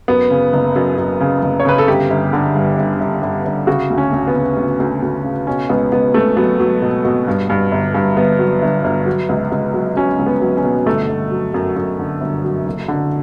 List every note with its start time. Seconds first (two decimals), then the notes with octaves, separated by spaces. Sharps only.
0.08 F#2 B3
0.30 C#3
0.53 F#1
0.76 F#2
0.98 F#2
1.20 C#3
1.42 F#1
1.60 C#5
1.65 C#3 B4
1.78 A4
1.88 G1 G4
2.10 G1
2.33 D3
2.55 G2
2.78 G1
3.00 G1
3.22 G1
3.45 G1
3.67 C#3 F#4
3.90 D2
3.98 C#4
4.12 D2
4.27 B3
4.35 C#3
4.57 D2
4.80 D2
5.02 D2
5.25 C#3
5.47 B2 C#4
5.69 C#2 B3
5.92 C#2 B3
6.14 C#2 A3
6.37 F#3 B3
6.60 F#3
6.82 B2
7.05 B2
7.27 G2
7.50 G2
7.72 G1
7.94 G2
8.17 G1 B3
8.39 F#3
8.62 G1
8.84 G1
9.06 F#3
9.29 C#2
9.52 C#2
9.74 F#3
9.96 F#3 C#4
10.19 C#2
10.26 B3
10.41 F#3
10.57 C#4
10.64 B2
10.86 G1 A3
11.09 G1
11.31 F#3
11.54 F#2
11.76 F#2
11.99 D3
12.21 G1
12.44 F#3
12.66 F#1
12.88 D3